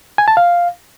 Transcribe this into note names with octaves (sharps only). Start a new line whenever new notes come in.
G#5
A5
F5